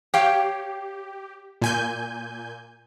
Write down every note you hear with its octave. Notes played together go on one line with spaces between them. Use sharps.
G4 C#5 F5 G5
A#2 G#5 G6